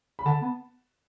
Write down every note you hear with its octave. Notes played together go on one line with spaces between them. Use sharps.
B5
D3 A5
B3